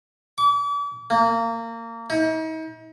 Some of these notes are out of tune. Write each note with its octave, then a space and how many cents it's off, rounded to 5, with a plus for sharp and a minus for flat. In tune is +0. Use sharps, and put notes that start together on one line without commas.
D6 -40
A#3 -25
D#4 +40